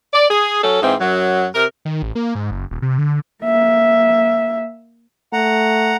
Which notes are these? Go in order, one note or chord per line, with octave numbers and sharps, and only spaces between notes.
D5
G#4
F#3 C#4 A4
G#2 E3 C4
F#2 F#3
C3 A#4
D#3
A1
A#3
G#2
F#1
D#1
C3
D3
A#3 E5
A3 F#5 A#5